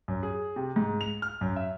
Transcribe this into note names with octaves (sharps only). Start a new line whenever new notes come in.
F#2
G#4
C3
G#2
F7
F6
F#2
E5